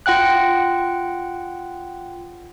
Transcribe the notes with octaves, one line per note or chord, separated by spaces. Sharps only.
F4 F#5 G5 F#6